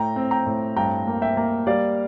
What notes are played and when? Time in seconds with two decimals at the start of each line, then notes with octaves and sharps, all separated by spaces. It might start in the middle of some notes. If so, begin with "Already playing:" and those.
Already playing: A2 G5 A#5
0.16 C4
0.31 G5 A#5
0.46 A2
0.76 G2 G5 A#5
1.07 A#3
1.22 E5 G5
1.37 A#3
1.67 G3 D5 F5